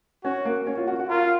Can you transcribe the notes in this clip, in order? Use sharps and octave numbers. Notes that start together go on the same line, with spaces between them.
C#4 F#4
A#3
C#4
F4
F#4
F#4
F4 A#4